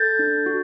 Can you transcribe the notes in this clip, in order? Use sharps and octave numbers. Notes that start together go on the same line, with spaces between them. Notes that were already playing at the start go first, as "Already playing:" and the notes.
Already playing: A4 G6 A6
D4
F#4